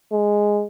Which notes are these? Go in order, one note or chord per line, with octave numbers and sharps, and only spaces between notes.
G#3